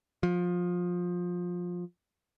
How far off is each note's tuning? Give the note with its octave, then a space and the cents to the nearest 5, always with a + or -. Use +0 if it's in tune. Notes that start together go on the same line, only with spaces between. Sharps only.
F3 +20